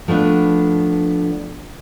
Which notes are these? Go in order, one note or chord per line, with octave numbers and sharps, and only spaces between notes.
F3 A3 B3 D4